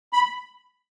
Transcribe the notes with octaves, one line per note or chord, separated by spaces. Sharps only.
B5